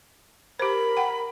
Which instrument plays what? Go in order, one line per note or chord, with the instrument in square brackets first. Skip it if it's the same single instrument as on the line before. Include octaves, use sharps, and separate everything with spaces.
[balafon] G4 C5 [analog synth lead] A#4 [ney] B5
[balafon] F#5 G5